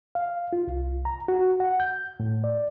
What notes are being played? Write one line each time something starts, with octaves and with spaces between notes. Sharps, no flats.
F5
F4
C2
A#5
F#4
F#5
G6
A2
D5